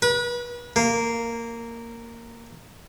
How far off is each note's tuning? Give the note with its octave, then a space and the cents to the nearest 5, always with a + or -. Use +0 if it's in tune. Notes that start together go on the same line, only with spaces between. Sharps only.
B4 -35
A#3 -10